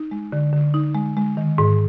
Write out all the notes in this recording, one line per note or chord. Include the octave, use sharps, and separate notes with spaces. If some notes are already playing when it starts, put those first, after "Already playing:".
Already playing: D#4
G#3
D3
D3
D#4
G#3
G#3
D#3
G#2